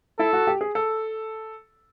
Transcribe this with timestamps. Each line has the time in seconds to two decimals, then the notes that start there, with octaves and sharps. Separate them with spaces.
0.19 E4 A4
0.33 F#4
0.47 G4
0.61 G#4
0.75 A4